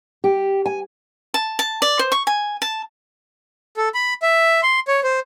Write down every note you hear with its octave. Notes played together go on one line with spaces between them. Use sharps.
G4
G#5
A5
A5
D5
C5
C#6
G#5
A5
A4
B5
E5
C6
C#5
C5